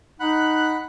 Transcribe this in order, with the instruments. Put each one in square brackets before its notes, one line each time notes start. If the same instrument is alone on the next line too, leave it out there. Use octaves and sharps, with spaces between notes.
[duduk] D#4 [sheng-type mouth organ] F#5 B5 F#6